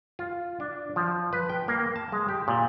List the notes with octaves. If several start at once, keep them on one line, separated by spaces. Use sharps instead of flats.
F4
D4
F3
B4
G5
A#3
A5
G#3
G4
A#2